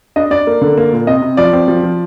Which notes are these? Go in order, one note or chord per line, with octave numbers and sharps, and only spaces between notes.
D4 D#5
D4 D5
A#3
D3
A#3
A#2
C3 D#5
C3
F3 D5
C4
F3
F3